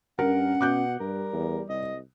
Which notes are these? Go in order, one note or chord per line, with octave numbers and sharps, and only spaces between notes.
G2 C#4 A#4 F#5
B2 D6 F#6 G6
G2 G3 A#4
E2
C2 D#5